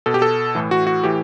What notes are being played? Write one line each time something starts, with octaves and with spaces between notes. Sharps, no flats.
B2 A4
G4
A4
A2 E3
F#4
F#4
A2 E3 G4